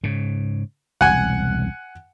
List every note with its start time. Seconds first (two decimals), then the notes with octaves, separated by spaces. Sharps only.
0.04 G#2 C#3
1.01 E1 C2 F#5 G#5